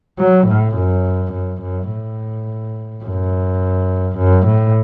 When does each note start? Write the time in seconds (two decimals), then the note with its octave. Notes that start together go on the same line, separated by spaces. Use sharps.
0.19 F#3
0.48 A2
0.76 F#2
1.33 F#2
1.62 F#2
1.91 A2
3.04 F#2
4.18 F#2
4.47 A2